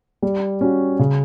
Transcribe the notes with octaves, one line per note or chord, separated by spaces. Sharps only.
G3
C#4 F#4
C#3